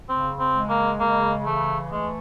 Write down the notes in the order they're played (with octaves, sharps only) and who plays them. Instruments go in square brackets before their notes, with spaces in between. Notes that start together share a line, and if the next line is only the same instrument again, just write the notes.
[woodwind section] C#3 [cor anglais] C4
[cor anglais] C4
[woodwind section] G#3
[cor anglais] A#3
[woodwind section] C#3 [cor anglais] A#3
[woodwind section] E3 [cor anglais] A3
[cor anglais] G#3 [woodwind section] A3